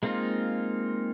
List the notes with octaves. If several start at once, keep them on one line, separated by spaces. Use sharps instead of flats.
G#3 A#3 C4 D#4 F4